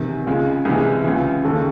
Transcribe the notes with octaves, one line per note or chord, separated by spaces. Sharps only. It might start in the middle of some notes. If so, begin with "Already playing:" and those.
Already playing: E2 C3 D#3
C#2 C#3 G#3
C2 C3 E3 G#3 G#4
C#2 C#3 E3
D#2 C#3 G#3 A4